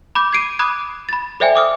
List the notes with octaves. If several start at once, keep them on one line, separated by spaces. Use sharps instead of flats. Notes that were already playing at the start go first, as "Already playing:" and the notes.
B5 D6 G6
G#6 C7 D7 D#7
B5 D6 D#6 F#6 G#6
B5 A6
A4 C5 D5 E5 G5 G#5
D6 D#6 F6